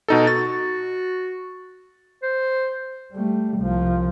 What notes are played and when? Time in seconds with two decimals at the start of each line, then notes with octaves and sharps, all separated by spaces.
0.08 B2 D#4 A4
0.27 F#4 A6
2.23 C5
3.13 G3 A3
3.58 C2 F3